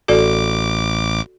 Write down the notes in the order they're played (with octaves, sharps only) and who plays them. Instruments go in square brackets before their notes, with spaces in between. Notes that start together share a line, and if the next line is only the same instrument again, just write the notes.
[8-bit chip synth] A1 D6 [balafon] F#4 A4 D5